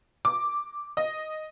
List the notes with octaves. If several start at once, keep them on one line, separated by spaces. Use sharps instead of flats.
D6
D#5